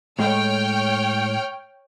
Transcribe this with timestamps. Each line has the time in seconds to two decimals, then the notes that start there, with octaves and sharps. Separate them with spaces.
0.19 A2 G#3 C#5 G5 F6